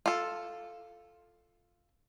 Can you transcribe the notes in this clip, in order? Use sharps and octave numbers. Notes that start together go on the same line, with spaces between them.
F4 A4